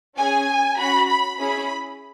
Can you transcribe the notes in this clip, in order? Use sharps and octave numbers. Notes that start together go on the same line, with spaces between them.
C#4 G#4 G#5
C#4 F#4 B5
B5
C#4 E4 G#4 B5